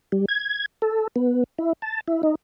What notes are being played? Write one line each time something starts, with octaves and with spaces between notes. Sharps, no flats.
G3
G#6
A4
B3
E4
A5
E4
D#4